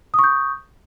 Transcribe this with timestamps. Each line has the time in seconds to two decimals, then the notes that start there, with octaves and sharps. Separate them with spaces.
0.14 D#6
0.19 C#6
0.24 G6